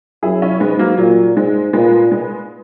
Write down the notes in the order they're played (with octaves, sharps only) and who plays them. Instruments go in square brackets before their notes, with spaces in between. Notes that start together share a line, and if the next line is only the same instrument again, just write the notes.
[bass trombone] F#2 [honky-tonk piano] E4 G#4
[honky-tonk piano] C#4 E4
[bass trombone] G#2 [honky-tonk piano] G#3 B3
[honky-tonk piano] F#3 A#3
[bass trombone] A#2 [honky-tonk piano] F#3
[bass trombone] G#2 [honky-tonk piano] G#3
[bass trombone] A#2 [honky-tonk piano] G#3 B3
[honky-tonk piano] G#3 B3